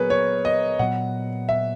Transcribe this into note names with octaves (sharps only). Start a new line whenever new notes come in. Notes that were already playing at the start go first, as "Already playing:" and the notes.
Already playing: A#2 F#3 B3 G#4 A#4 B4 C#5
C#5
D#5
A#2 F#3 B3 F#5
E5